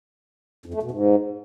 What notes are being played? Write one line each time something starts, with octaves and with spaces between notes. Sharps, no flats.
F2
A3
B2
G#2